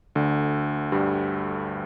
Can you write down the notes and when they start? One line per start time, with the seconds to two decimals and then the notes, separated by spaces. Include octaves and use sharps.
0.15 D2 D3
0.92 G2 G3